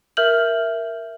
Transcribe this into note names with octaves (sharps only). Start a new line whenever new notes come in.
A#4 E5 F6 G6 F#7